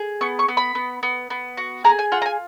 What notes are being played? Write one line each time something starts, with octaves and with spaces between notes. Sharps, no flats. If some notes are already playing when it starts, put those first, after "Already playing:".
Already playing: G#4
B3 C#6
C#6
B3
B5
B3
B3
B3
F#4
G#4 A#5
G#5
F4 F#5
A#5
G#5